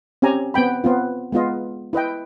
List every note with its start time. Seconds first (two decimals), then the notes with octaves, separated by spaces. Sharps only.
0.22 C4 C#4 G4 G#5 A#5
0.54 B3 C4 G5 B5
0.84 B3 C4 F4
1.32 G#3 B3 F4 D#5
1.93 E4 B4 D#5 G5